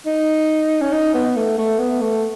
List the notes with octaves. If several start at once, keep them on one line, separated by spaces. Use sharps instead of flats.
D#4
C#4
D#4
B3
A3
A3
B3
A3